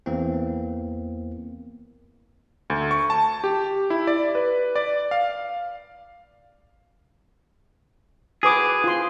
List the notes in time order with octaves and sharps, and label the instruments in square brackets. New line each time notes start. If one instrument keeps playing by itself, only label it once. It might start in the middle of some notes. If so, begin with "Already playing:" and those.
[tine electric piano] E2 E3 A#3 C4
[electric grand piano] D2
C#6
A5
G4
E4
D5
B4
D5
F5
[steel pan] F#4 B4 D6 [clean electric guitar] G#4
[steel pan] F4 C6